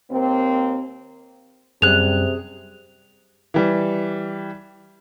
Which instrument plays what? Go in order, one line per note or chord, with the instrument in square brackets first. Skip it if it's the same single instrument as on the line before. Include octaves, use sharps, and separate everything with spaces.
[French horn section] D#2 A#3 C4
[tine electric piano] F#2 G3 [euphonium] C3 [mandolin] G#4 F#6 [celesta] F7
[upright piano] E3 G3